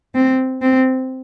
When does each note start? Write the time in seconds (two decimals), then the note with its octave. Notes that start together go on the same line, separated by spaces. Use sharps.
0.15 C4
0.62 C4